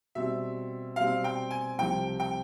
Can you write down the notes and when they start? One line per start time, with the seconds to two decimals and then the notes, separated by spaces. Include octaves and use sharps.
0.15 B2 G3 C4 E5
0.96 B2 G3 C4 F5
1.24 G5
1.51 G#5
1.78 C2 C3 F3 G5
2.20 G5